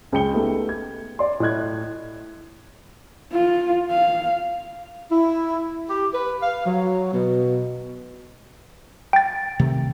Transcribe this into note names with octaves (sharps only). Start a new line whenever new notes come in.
C#2 G#3 G5 C#7 G7
A3 B3 D#4 G4
G#6
D5 C6
A2 E4 D#5 F#6 G#6
F4
F5
E4
G4
B4
F5
F#3
B2
G5 A6
C3 D#3 A3